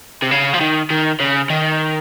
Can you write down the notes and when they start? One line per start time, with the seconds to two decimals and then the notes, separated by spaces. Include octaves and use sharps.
0.23 C3
0.31 C#3
0.54 F3
0.61 D#3
0.91 D#3
1.20 C#3
1.50 D#3